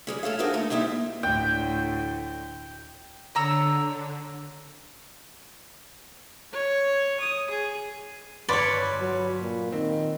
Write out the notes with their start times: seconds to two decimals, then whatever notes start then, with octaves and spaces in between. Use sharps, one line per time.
0.07 G3 G#3 C#4
0.23 A3 A4 C#5 F5
0.39 D4 D#4 F#4 G#4 A#4 C5
0.53 D#2 A3 D#4 A#5
0.70 G3 A#3 C4 D#4 E4
1.23 D2 A2 G5
3.35 D3 C#5 A#5 E6
6.53 C#5
7.20 D#6
7.50 G#4
8.49 G1 B4 C#5 D5 B5 C6
9.01 F#3
9.41 A#2
9.72 D#3 C4